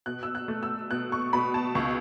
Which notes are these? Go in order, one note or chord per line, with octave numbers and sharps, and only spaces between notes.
B2 F#6
E6
F#6
A3
E6
B2 F#6
C#6
B2 B5
A5
C#2 C#6